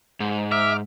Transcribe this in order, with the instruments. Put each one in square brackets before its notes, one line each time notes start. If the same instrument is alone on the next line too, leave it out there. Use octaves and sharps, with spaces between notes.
[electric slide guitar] G#2
[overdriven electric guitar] E5 [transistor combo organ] D6 F6